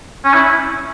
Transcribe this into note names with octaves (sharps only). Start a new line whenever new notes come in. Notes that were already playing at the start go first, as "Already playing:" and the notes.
C#4
E4